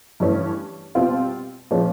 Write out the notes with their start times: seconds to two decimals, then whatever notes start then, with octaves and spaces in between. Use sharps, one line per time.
0.20 G2 E3 A3 C#4
0.95 B2 G3 C4 F4
1.71 A#2 F3 G#3 C#4